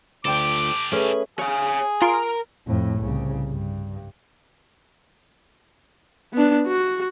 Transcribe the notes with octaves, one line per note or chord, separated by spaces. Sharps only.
D2 F4 G4 A4 G5 D6
A3 C#4 G#4 B4
G#4 C#5 F5
F4 A#4 A#5 C6 D7
F2 A2
C2 C#3
G2
B3 D4
F#4